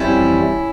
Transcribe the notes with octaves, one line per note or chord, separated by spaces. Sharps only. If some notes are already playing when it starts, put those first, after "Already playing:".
Already playing: F2 E3 G3 C#4 E4